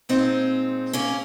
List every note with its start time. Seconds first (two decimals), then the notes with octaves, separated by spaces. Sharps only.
0.09 A#2 G#3 C4 D#4
0.93 A#3 C#4